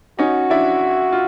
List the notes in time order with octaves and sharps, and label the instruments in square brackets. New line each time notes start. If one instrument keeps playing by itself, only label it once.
[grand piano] C#4 D#4 [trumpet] F#4
[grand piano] D4 E4
F4